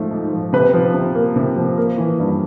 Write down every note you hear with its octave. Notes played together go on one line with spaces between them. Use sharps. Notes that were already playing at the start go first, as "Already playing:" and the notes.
Already playing: G#2 F3 A3
G#2
F3
C3 B4
F3
C3
A#3
C3
F3
A#3
E3
G2